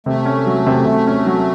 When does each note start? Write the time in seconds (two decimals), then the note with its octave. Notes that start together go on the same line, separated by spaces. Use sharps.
0.06 C3 A3
0.26 C#4
0.46 F#3
0.66 C3
0.86 C3
1.07 C#4
1.26 F#3